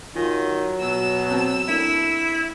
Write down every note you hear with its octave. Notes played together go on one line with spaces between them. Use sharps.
D#3 F#3 F4 G#5
B2 E6
B3 C4 A5
A3 D4 E4 A#4